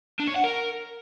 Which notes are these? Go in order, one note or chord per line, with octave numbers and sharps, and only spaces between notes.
D4
C#5
F#5
A#4